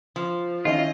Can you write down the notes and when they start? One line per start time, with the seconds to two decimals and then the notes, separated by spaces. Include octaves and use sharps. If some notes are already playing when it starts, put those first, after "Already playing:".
0.16 F3
0.65 D#3 C#4 E4 F4 D#5